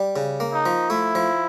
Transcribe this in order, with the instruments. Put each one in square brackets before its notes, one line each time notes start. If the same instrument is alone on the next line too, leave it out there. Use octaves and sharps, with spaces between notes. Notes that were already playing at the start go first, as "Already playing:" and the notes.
Already playing: [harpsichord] G3
C#3
A#3
[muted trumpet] D#4
[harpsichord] F3
[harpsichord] A3 [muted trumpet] E4
[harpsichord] F3